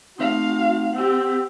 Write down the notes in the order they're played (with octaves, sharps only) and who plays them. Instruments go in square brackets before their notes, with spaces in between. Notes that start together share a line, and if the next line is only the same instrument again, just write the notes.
[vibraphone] A3 C4 D#4 [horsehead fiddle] F#4 F5
[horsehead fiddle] C4 G4 [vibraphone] F#5 E6